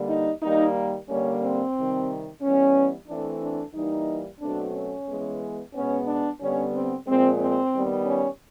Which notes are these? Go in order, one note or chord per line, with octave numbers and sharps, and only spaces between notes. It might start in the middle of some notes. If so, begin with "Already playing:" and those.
Already playing: D3 G3 A#3
D#4
D#3 G3 A#3 D#4
D3 G3 A#3 C#4
C4
C3 D#3 G3
E3 G3 B3 C#4
E3 A3 C4 D4
D4
E3 G3 A#3 D#4
B2 F#3 A3 C4 D4
C#4
E3 G#3 B3
B2 G#3 B3 C#4
D4
D3 G3 B3 C#4
C4
A#2 F3 G#3 C4
C4
D#3 G3 B3
C#4